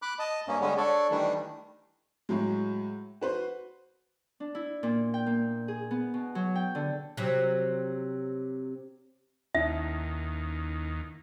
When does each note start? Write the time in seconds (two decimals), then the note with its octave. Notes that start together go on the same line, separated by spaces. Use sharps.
0.02 B5 D6 F#6
0.19 D#5 A5
0.48 G2 A#3 C#4
0.61 D3 G3 G#3 B3 C#4
0.77 D4 A4 C#5 D5
1.11 D#3 E3 G3 A3 D4
2.29 A2 F#3 G#3
3.21 F#4 B4 C5
4.40 D4
4.55 E4
4.83 A#2
5.14 G5
5.27 A#3
5.68 G#4
5.91 B3
6.14 B2
6.35 F#3
6.55 G5
6.75 D3
7.17 C3 F#3
9.55 D#2 C#4 D#4 E4 E5